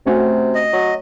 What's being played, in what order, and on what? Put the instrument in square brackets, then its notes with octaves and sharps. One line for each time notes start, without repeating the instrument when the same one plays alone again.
[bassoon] C3 [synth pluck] A3 C#4 F#4
[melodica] D#5
[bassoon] F#3